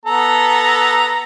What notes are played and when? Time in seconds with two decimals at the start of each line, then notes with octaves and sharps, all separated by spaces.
0.06 B3 A4 A#5